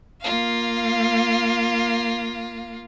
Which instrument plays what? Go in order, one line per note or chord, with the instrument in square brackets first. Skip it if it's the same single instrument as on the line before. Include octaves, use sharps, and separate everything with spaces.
[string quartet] A#3 F4 F5